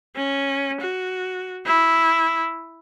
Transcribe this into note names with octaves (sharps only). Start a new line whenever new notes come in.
C#4
F#4
E4